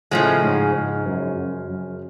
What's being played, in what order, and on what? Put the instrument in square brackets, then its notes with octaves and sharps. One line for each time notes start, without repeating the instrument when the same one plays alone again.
[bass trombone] A2 [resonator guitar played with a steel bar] C#3 F3 G#3
[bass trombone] G#2
G#2
F#2
F#2
F#2